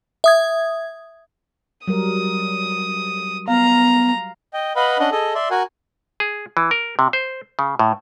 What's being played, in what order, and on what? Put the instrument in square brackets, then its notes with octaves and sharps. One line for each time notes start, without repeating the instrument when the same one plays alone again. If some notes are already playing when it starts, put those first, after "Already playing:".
[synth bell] E5 D#6 G#6
[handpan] F#3 G3 A#4 [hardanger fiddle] D#6
[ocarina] B3 [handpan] F5 [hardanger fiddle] A#5
[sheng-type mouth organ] D#5 G5
B4 D#5 F5 F#5 B5
C#4 D4 D#5 F#5
G#4 A4 D#5
D5 E5 C6
F#4 A#4 F#5 G#5
[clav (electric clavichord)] G#4
E3
A#4
C3
C5
C#3
A2